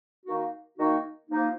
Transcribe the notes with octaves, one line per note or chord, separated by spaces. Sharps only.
D#3 A#3 D#4 F#4
D#3 A#3 D#4 F#4
F3 A#3 D#4